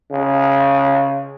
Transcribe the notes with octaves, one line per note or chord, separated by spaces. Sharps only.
C#3